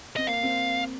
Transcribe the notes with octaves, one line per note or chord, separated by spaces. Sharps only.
C4 D#5
A#3 F5
C4